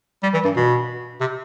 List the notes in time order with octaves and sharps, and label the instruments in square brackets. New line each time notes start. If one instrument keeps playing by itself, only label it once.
[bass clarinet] G3
E3
G2
B2
C3